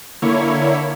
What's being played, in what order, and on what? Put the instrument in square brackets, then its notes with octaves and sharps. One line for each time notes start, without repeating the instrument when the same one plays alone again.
[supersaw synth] D3 A#3 E4 C#5